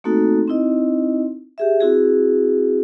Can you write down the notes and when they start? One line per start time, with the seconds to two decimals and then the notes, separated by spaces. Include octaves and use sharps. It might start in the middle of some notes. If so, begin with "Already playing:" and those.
0.04 A3 A#3 C4 D#4 F#4 A4
0.48 C4 D#4 E4 D#5
1.58 G4 G#4 E5
1.81 C4 E4 F#4 G#4